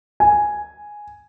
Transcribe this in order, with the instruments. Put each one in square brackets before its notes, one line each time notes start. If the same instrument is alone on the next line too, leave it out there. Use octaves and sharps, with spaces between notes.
[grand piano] G#5